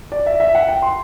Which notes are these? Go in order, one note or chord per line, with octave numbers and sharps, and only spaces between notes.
D5
E5
E5
F#5
G5
C6